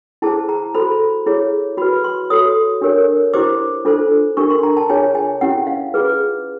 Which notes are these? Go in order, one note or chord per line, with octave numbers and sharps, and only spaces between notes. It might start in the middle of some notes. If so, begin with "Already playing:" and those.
E4 G#4 C5 A5
A#5
F#4 A4 C5 B5
E4 G#4 C#5
F#4 B4 B5
C6
F#4 A4 C#5 D#6
D4 G4 A#4 C#5
E4 G4 C5 D6
D4 F4 A4 C5
D4 G4 A#4 C#6
C6
A#5
A5
F4 G#4 C#5 G#5
G#5
C#4 E4 G4 F#5
F5
F4 G#4 B4